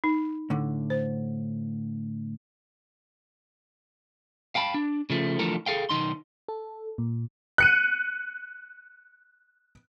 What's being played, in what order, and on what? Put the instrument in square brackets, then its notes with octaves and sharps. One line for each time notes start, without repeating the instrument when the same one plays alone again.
[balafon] D#4
[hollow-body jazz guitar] A2 D3
[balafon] C5
[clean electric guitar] F5 G5 A5 B5
D4
C#3 F3 A3
D3 E3 F3 A3 A4 A#4
G#4 A4 F5 G5
B1 D#3 D#4 C6
[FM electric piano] A4
A#2
[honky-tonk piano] F#6 C#7 D#7